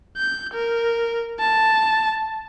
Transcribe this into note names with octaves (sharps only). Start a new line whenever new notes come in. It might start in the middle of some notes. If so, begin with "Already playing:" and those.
G6
A#4
A5